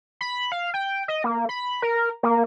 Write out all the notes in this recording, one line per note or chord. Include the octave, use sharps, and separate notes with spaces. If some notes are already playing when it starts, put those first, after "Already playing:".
B5
F5
G5
D#5
A#3
B5
A#4
A#3